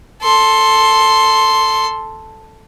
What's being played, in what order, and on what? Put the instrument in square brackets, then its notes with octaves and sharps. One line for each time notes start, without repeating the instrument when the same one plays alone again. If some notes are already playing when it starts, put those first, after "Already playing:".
[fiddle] A4 C6